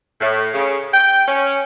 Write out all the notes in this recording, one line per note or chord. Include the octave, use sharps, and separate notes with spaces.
A2
C#3
G5
C#4